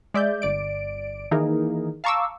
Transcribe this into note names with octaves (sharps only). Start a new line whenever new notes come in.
G#3 D5 E5 G6
G1 D5 D7
D#3 E3 A#3 D#4 G#4 A#4
F5 A5 A#5 C#6 D6 E6